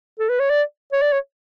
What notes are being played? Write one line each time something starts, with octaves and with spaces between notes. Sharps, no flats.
A4
B4
C#5
D5
C#5
D5
C#5